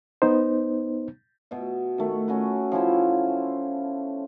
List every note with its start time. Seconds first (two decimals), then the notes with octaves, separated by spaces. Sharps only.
0.22 B3 D#4 C5
1.51 B2 E5
1.98 D#3 A3
2.28 C#4 F#4 B4
2.72 F3 C#4 E4 C5